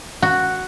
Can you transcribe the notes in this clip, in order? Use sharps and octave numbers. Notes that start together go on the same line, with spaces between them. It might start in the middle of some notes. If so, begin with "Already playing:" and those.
F#4